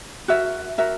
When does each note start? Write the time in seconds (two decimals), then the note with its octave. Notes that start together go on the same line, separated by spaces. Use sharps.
0.28 F#4 A#4 E5
0.78 F#4 A#4 E5